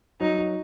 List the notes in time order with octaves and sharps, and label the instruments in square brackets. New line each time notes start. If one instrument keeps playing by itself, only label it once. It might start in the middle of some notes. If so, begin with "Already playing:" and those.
[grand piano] F#3 [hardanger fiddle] D#4
[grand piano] F#3